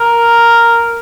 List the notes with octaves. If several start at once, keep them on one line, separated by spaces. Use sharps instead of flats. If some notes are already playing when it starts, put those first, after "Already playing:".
Already playing: A#4